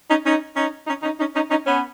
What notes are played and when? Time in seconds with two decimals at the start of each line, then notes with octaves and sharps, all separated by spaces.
0.09 C#4 D#4
0.25 C#4 D#4
0.56 C#4 D#4
0.88 C#4 D#4
1.03 C#4 D#4
1.19 C#4 D#4
1.35 C#4 D#4
1.50 C#4 D#4
1.66 B3 C#4